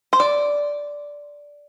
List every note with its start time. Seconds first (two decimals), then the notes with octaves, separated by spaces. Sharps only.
0.13 C5
0.20 D5